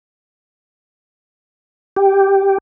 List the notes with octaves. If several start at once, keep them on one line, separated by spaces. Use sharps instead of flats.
G4